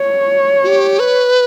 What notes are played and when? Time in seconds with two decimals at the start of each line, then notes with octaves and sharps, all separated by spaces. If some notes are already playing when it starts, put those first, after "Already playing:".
Already playing: C#5
0.63 F#4
0.67 G4
0.99 B4